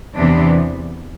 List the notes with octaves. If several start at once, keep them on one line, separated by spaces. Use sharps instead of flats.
E2 C3 E3 B3 D4